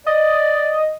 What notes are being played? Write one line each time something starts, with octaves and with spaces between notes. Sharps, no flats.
D5 D#5